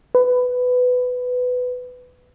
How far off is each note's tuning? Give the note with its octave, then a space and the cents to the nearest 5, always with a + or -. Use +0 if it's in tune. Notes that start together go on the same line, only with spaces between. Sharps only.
B4 +15